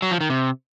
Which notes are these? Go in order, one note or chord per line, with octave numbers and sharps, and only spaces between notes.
F#3
F3
D#3
C3